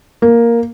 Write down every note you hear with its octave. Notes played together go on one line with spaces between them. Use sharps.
A#3